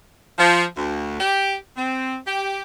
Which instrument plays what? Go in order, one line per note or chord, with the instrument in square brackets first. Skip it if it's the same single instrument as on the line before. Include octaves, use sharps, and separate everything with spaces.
[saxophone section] F3
D2
G4
C4
G4